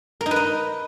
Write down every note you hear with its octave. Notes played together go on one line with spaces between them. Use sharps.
A#4
D#4
B4
D#5